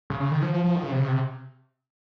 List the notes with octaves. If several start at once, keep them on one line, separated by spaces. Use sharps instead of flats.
C#3
C#3
D#3
F3
F3
F3
D#3
C#3
C3
C#3
C3